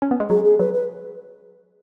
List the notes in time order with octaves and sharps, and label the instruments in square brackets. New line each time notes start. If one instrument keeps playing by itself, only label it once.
[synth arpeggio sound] C#4
B3
G#3
[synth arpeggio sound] F#3 [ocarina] G#4
[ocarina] G#4
[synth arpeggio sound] F#3 [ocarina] B4
[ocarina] B4